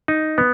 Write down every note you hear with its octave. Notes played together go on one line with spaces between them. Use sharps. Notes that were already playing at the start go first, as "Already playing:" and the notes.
D#4
B3